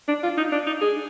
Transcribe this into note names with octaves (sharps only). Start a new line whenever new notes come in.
D4
F4
D#4
D4
D#4
G#4